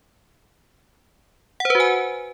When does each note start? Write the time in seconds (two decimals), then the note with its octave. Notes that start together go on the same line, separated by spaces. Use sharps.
1.60 F#5
1.65 C5
1.70 B4
1.75 F#4
1.80 G#5